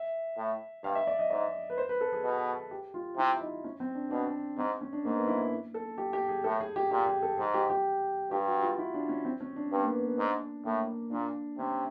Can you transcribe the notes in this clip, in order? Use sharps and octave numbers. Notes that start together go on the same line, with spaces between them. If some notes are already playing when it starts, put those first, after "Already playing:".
Already playing: E5
A2
G2 F5
E5
D5
D#5
G#2 D5
B4
C5
B4
A4
G#4
B2
G4
F4
C3 E4
D#4
C#4
C4
D4
B2 D4
G#2 C4
C#4
D4
G#2 A#3
B3
E4
A4
G4
G4
G#4
A2 A4
G#4
G4
A#2 G4
G#4
A4
G#2 G#4
G4
G4
G2 G4
F#4
F4
E4
D4
C#4
C4
C#4
D4
G2 B3
A#3
B3
B3
G#2 D4
A2 A#3
A#2 D4
C3 C#4